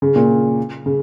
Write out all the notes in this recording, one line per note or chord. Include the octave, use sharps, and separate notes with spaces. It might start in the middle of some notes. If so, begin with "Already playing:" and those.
C#3
A#2
C#3